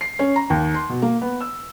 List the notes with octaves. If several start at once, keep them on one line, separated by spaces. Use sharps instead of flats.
C7
C#4
A#5
D#2
C6
B2
A#3
B3
E6